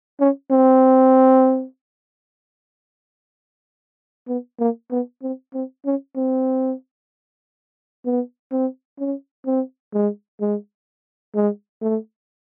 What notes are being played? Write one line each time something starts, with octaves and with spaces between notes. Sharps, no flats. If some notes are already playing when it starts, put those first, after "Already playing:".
C#4
C4
B3
A#3
B3
C4
C4
C#4
C4
B3
C4
C#4
C4
G#3
G#3
G#3
A3